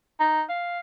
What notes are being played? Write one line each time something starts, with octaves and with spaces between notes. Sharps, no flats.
D#4
F5